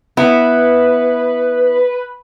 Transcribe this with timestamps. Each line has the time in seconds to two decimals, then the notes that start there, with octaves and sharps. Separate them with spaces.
0.17 B3 E4 B4